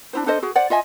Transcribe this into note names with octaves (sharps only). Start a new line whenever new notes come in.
D4 E4 C5
D4 A4 C5 D#5
F#4 G#4
C5 D5 F#5
F4 D#5 E5 G#5